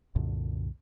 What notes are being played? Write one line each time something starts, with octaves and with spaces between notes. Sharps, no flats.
C2 F#2 A#2 D3